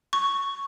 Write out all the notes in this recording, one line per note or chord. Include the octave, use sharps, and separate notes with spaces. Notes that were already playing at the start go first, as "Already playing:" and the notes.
C#6